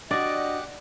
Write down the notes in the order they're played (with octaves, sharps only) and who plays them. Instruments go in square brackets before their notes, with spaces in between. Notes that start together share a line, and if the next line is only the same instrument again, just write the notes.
[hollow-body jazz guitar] D4 F#4 [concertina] G4 F#5 D6 [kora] D5 [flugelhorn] D#5